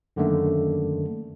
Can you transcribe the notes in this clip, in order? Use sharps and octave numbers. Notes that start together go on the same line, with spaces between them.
F#2 D3 D#3 A3 A#3